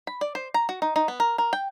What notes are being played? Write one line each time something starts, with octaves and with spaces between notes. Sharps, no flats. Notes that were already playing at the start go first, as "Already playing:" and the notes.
B5
D5
C5
A#5
F#4
D#4
D#4
B3
A#4
A#4
G5